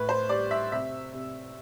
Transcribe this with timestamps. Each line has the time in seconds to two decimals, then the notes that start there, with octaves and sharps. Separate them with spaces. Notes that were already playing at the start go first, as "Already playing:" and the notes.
Already playing: A2 B4
0.09 C5
0.29 G3 D5
0.51 E5
0.72 C3 E5
1.13 C3